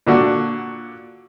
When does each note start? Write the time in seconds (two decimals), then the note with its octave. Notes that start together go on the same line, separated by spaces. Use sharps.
0.07 A#2 D3 F#4